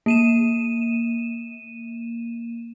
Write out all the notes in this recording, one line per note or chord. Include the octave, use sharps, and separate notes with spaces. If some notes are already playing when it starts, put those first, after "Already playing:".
A#3 D#7 E7